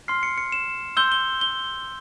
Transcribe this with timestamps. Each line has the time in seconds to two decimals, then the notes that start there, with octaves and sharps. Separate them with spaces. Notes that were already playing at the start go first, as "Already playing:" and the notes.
0.08 C6 F6 C7
0.23 C#7
0.38 C#7
0.52 E7
0.97 C6 E6 G6 G7
1.12 G7
1.41 G7